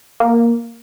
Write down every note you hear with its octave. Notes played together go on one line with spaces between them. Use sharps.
A#3